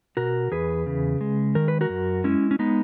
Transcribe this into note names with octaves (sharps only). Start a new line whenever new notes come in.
B2 F#4 A#4
E2 G#4 B4
C#3
G#3
D#3 A#4
B4
F#4 A#4
F#2
G#3 C#4 E4
C#4
G#3 B3 D#4